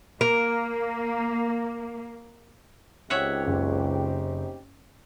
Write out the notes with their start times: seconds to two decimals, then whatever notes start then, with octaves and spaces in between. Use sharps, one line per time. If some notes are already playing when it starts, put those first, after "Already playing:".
0.21 A#3 A#4
3.10 C#2 C4 D#4 G4 C#5 E5 F#5
3.47 F#1